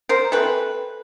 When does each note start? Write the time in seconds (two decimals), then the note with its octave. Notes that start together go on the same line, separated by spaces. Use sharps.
0.09 A#4 C5
0.32 E3 A3 C4 A4 B4